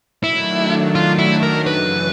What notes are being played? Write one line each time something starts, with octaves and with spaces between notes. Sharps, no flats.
D#3 F#3 A3 D4 E4
F4
E4
A#4
F#2 C#3 E3 B4